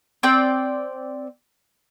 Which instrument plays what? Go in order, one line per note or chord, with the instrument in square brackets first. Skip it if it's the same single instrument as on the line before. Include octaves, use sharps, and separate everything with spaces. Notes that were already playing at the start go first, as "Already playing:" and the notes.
[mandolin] C4 D5 G5